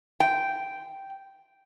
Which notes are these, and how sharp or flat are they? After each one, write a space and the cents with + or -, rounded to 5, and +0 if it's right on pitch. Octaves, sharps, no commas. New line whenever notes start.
G5 -5